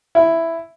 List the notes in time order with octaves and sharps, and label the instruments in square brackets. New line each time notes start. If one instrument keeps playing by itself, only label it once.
[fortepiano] E4